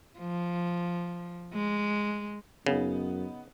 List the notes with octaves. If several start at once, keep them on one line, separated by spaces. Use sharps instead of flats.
F3
G#3
F#2 C#3 B3 D#4